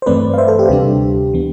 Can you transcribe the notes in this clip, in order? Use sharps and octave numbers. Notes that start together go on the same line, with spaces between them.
C5
G2 E3 A3 C4 B4 D5
F5
C5 E5
A4
G4
D2 C3 G3 D4 G4
E3 B3